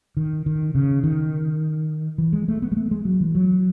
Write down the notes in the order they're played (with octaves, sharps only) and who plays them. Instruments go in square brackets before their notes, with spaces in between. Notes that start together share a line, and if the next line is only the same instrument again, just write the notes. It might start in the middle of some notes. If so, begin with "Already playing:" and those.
[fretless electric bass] D#3
D#3
C#3
D#3
E3
G#3
A3
B3
G#3
A3
G#3
F#3
E3
F#3